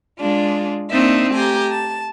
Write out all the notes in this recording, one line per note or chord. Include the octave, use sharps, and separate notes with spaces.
G#3 D4 F4
A#3 C4 D4 D#4 E5
A3 G4 G#5 A#5
A5